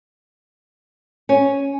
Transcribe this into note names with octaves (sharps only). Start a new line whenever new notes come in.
C#4